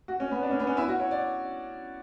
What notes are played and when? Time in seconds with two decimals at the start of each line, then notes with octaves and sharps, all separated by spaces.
0.08 F#4
0.20 C#4
0.31 B3
0.42 D4
0.51 C#4
0.60 B3
0.67 C#4
0.77 E4
0.88 F#4
1.00 C#5
1.11 D5